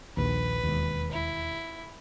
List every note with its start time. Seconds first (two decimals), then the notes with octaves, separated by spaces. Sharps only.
0.17 A#1 D#2 B4
0.63 E1 D#2
1.12 E4